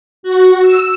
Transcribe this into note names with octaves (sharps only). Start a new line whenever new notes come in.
F#4
E6